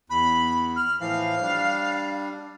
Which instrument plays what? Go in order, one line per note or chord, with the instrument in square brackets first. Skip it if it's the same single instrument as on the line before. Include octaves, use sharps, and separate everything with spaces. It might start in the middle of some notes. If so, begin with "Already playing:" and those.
[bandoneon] E2 [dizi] B5
[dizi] F6
[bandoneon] A2 E3 F3 [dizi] F5
[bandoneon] G3 D4